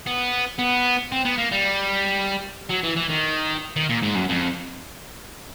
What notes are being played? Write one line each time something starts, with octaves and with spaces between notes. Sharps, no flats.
B3
B3
C4
B3
A#3
G3
F#3
E3
E3
D#3
D#3
A#2
G#2
F#2
F2